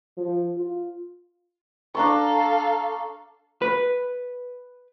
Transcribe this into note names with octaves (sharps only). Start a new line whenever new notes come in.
F3
F4
D4 A4 F5 A#5 C#6
B4